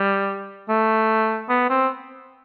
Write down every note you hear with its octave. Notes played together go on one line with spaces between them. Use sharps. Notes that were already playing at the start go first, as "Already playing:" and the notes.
Already playing: G3
A3
B3
C4